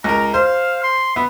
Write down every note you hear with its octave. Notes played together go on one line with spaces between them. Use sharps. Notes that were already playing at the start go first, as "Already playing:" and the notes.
C#2 A#4 A#5
C5 F5
C6
B3 E5